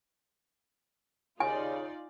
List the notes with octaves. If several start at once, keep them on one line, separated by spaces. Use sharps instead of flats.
D#2 C#3 D#4 F4 D5 G#5